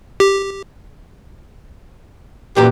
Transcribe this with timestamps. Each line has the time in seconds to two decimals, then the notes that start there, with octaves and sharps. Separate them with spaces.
0.20 G4
2.56 F#2 A#2 E3 G4